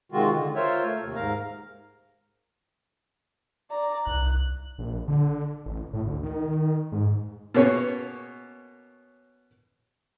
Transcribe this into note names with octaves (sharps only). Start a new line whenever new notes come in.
C3 D#3 G#3 C4 F4 F#4
D3
F4 A#4 C5 C#5 E5
A3
D#2 C3
G#2 A#4 F5 A#5
D5 A#5
C2 F#6
A#1
D3
A1
A2
D2
D#3
D#3
G#2
B2 A#3 C#4 C#5